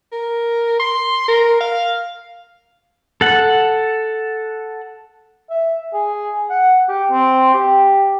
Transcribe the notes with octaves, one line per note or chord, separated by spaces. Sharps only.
A#4
C6
A#4
F5
A4 F#5
E5
G#4
F#5
G4
C4
G4